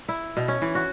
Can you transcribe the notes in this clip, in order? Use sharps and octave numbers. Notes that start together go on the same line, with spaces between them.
E4
B2
C#4
E3
F#4